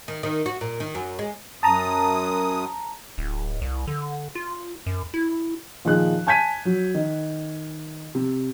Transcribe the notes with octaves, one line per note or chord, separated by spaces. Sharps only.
D#3
D#3
F#4
A#2
D#3
F#2
G#3
F#2 A5 A#5 D#6
D1
C2
D3
F4
F#2
E4
A#2 D#3 F3 G#4 F#6
G#5 A5 G6 G#6 B6 D#7
F#3
D#3
C3